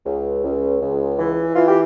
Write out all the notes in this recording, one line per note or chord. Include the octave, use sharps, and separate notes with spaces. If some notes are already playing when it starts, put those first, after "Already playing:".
C#2
C#2
C#2
E3
E3 F4
G4